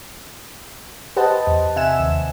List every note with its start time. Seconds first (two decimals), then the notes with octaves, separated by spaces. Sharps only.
1.16 G4 B4 C5 D#5 F#5 A5
1.47 E2
1.76 C3 E5 F#5 G#5 E7
2.00 D#2